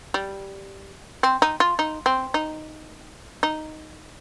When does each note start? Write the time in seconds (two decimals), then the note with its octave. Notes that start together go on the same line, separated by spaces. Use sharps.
0.14 G3
1.23 C4
1.42 D#4
1.60 F4
1.79 D#4
2.06 C4
2.34 D#4
3.43 D#4